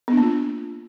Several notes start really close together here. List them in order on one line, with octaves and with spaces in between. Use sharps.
B3 D4 A#3 F4